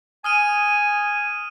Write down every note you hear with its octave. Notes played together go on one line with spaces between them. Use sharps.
G#5 D#6 F6 D#7